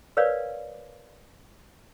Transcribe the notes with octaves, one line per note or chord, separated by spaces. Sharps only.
A#4 B4 C#5 D5 F5